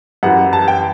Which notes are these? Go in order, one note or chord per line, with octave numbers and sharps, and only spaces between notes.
F#2 E3 G3 F#5
A5
G5